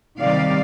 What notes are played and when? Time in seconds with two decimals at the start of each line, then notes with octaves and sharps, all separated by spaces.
0.19 C3 D#3 G3 D5 F5